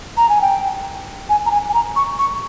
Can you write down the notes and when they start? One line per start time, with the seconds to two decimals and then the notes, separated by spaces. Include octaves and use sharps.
0.17 A#5
0.29 G#5
0.42 G5
1.29 G#5
1.46 A#5
1.51 G#5
1.69 G#5
1.74 A#5
1.96 C#6
2.19 C#6